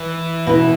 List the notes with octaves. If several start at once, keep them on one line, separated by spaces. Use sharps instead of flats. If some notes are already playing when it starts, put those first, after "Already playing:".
Already playing: E3
B2 B3 E4